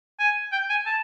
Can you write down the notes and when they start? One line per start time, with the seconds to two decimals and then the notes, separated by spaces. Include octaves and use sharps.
0.20 G#5
0.53 G5
0.70 G#5
0.86 A5